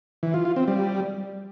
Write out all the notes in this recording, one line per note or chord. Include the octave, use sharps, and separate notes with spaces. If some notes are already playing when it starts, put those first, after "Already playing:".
E3
F4
F4
C4
G3